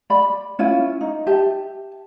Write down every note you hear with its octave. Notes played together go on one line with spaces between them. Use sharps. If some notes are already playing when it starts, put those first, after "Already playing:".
D5 B5
C#4 E4 F4
D#4
G4 E5 A5